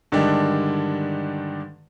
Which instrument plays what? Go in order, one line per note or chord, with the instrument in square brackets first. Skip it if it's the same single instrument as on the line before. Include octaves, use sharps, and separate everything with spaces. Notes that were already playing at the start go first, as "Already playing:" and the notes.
[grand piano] G2 D3 D#3 G#3 D4 G4